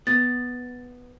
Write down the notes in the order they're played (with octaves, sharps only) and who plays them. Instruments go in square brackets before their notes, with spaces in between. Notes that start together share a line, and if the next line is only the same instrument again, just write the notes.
[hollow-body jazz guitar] B3 [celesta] A6